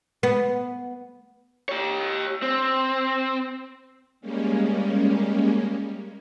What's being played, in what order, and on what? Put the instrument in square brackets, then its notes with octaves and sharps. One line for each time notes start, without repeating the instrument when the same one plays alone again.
[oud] B3
[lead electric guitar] G4 C#5
C4
[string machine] G3 G#3 A#3 C#4